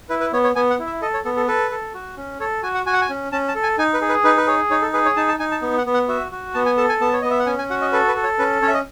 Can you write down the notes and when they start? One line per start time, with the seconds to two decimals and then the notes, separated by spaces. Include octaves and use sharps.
0.09 E4 B4
0.21 B4
0.33 B3 C#5
0.44 C#5
0.56 B3 G#5
0.70 F#5
0.79 E4
0.86 E5
1.02 A4 D#5
1.14 C#5
1.25 B3 A4
1.37 A4
1.48 A4 B4
1.71 A4
1.94 F#4
2.17 C#4
2.40 A4 C#5
2.63 F#4 G#5
2.75 F#5
2.86 F#4 G#5
2.93 F#5
3.01 G#5
3.10 C#4
3.32 C#4 A5
3.48 A5
3.55 A4
3.63 G#5
3.78 D#4 G#5
3.94 B4
4.01 G#4
4.09 B4
4.24 D#4 B4
4.37 B4
4.47 G#4 C#5
4.71 D#4 C#5
4.82 A4
4.94 G#4 B4
5.06 C#5
5.16 D#4 A5
5.28 A5
5.39 D#4 G#5
5.51 A5
5.62 B3
5.78 F#5
5.86 B3
5.94 F#5
6.08 F#4 E5
6.32 F#4
6.54 B3 A5
6.66 G#5
6.77 A4 A5
6.89 G#5
7.01 B3 A5
7.13 C#5
7.22 B3 D#5
7.31 E5
7.39 F#5
7.46 C#4 G#5
7.58 G#5
7.70 F#4 F#5
7.81 D#5
7.93 A4 B4
8.08 B4
8.16 A4
8.24 C#5
8.39 C#4 B4
8.62 C#4 C#5
8.68 E5
8.74 D#5